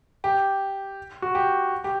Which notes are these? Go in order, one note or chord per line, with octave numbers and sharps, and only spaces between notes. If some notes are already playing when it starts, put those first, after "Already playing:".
G4
F#4
G4
G4